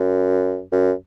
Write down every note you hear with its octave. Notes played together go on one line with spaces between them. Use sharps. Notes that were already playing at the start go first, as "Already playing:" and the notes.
Already playing: F#2
F#2